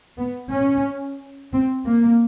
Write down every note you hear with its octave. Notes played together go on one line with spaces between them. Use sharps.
B3
C#4
C4
A#3